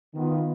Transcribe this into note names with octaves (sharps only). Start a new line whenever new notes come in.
D#3 B3 F4